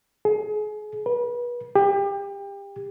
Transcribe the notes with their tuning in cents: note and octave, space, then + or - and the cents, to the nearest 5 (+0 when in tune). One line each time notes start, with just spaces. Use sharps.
G#4 +30
B4 -30
G4 +30